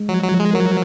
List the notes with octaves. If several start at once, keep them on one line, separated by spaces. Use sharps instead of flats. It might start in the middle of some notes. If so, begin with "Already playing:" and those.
Already playing: G#3
F3 F#3
F#3
F3
G#3
F#3 A#4